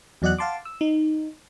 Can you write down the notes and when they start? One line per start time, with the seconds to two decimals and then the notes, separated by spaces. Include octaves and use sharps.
0.22 E2 F#3 D5 D#5 F#5 F#6
0.38 F5 F#5 A5 C6 D6
0.65 E6
0.81 D#4